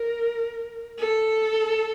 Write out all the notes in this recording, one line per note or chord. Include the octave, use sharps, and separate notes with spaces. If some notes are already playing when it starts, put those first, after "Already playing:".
Already playing: A#4
A4